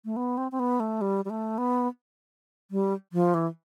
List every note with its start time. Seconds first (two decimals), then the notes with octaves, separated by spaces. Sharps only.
0.05 A3
0.16 B3
0.38 C4
0.52 C4
0.60 B3
0.80 A3
1.01 G3
1.25 G3
1.30 A3
1.58 B3
2.71 G3
3.13 F3
3.34 E3